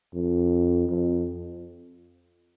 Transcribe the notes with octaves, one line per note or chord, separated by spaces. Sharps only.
F2
F2